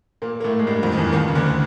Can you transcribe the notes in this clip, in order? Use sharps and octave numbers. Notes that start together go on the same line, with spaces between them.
A#2 A#3
A#3
A2 A3
G#3
G2 G3
F2 F3
D#3
E2 E3
D#2 D#3
C#3
D2 D3